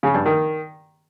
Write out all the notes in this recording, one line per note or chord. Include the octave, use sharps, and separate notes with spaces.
C#3
G2
D#3